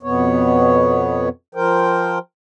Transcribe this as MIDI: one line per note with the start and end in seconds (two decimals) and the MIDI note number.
0.03 1.29 41
0.03 1.29 47
0.03 1.29 59
0.03 1.29 73
1.55 2.19 53
1.55 2.19 70
1.55 2.19 72
1.55 2.19 79